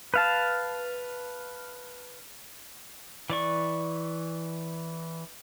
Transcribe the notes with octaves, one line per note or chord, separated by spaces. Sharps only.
B4 F5 A5
E3 D5 C#6